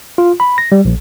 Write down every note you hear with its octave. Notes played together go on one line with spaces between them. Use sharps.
F4
B5
A#6
G3
A#1